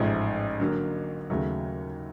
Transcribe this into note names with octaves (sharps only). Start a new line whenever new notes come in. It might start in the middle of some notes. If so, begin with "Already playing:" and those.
Already playing: A1 G#2 F3 A3
D3 F#3 A#3
D#2 C#3 F#3 A3